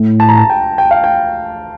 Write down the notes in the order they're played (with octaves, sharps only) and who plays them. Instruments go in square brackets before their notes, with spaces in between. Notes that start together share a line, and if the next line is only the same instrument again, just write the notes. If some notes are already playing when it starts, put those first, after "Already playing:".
Already playing: [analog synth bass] A2
[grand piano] A5
A#5
A5
G5
G5
F5
G5